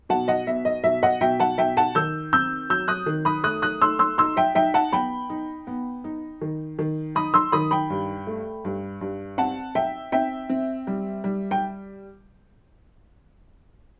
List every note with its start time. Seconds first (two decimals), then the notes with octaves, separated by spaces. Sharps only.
0.09 B2 F#5 A5
0.28 D#5 F#5
0.47 B3 E5
0.65 D#5
0.84 B2 E5
1.03 D#5 F#5
1.21 B2 E5 G5
1.40 F#5 A5
1.58 B2 E5 G5
1.77 F#5 A5
1.95 D#3 E6 G6
2.33 C4 E6 G6
2.70 F#3 E6 G6
2.88 D#6 F#6
3.06 D#3
3.25 B5 D#6
3.44 A3 D#6 F#6
3.62 D#6 F#6
3.82 A3 C6 E6
3.99 C6 E6
4.18 D#4 C6 E6
4.37 E5 G5
4.55 D#4 E5 G5
4.74 F#5 A5
4.93 B3 G5 B5
5.30 D#4
5.67 B3
6.04 D#4
6.41 D#3
6.79 D#3
7.15 D#4 B5 D#6
7.34 C6 E6
7.52 D#3 B5 D#6
7.71 G5 B5
7.90 G2
8.27 A3
8.65 G2
9.01 G2
9.38 C4 F#5 A5
9.75 D#4 E5 G5
10.12 C4 E5 G5
10.49 C4
10.87 G3
11.24 G3
11.51 G5